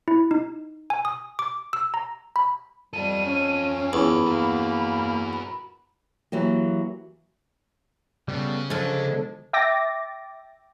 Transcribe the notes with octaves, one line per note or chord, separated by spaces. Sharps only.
E4
D#4
G#5
D#6
D6
E6
A#5
B5
G3 F4 A4 D#7
C#4
E2 B5
A#3 F#4 A#4
E3 F#3 A#3 G4
C#3 G3 B3 A4
D3 F3 F#3 G#3 D4 A4
E5 G5 D6 A6 A#6